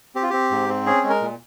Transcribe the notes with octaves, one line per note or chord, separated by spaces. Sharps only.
C4 G4
F4
C4 G4
G#2
C4
C#4 G#4
G#3
A#4
A#2